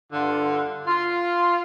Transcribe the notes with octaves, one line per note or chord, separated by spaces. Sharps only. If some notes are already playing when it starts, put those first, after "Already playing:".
G2 D3 F4
F4